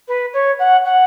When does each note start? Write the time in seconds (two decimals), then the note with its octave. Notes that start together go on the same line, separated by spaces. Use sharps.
0.08 B4
0.33 C#5
0.59 F#5
0.85 F#5